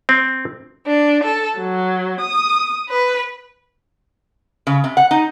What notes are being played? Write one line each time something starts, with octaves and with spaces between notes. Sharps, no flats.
C4
D4
A4
F#3
D#6
B4
C#3
C3
F#5
D#4